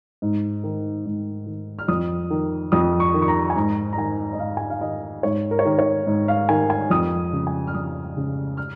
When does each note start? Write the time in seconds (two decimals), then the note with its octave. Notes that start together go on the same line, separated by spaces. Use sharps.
0.22 G#2
0.64 D#3
1.06 G#2
1.46 D#3
1.79 F6
1.88 F2 D#6
2.30 D#3
2.72 F2 D#6
3.00 C#6
3.14 D#3
3.22 C#6
3.28 A#5
3.50 G#5
3.56 G#2 A#5
3.93 A#5
3.97 D#3 G#5
4.33 D#5
4.39 G#2 F5
4.57 G#5
4.70 F5
4.81 D#3 D#5
5.23 G#2 C#5
5.51 A#4
5.59 C#5
5.65 D#3 A#4
5.79 C#5
6.07 G#2
6.28 F5
6.49 D#3 G#5
6.70 G#5
6.90 F2 D#6
7.33 C#3
7.47 G#5
7.67 F6
7.74 F2 D#6
8.17 C#3
8.57 F6